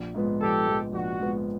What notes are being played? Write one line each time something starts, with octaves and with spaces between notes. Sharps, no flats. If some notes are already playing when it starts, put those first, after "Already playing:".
Already playing: A#1
G#2 F3 G#3 B3
A#1 G4 A4
G#2 F3 G#3 B3
A#1 F#4
G#2 F3 G#3 B3